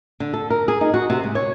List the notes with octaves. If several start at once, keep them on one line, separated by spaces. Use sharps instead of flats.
D3
A4
A#4
G#4
D#4
F#4
C3
G#2
C#5